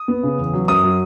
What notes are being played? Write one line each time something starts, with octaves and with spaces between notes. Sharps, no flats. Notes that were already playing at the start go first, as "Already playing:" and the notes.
Already playing: D#6
B3
C#3
E2
F#3
F#2 D#6
F#3